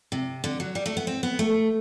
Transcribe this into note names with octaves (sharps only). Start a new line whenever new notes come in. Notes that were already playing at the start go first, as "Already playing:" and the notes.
C3
D3
F#3
G3
A3
B3
C4
B3
A3